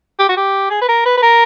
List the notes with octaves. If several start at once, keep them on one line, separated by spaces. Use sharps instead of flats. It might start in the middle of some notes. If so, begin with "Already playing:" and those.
G4
F#4
G4
G#4
B4
A#4
B4
B4
A#4